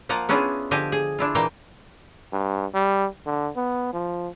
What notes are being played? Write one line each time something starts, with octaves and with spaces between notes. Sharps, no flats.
F3 A#3 F4 D#5 F5 F#5
B3 C#4 D4 E4 F4 G#4
D3 F3 G4 D#5 F5 G#5
G#4
D4 E4 F4
A#2 E3 A#3 D#5 F5 G5
G2
G3
D3
B3
F3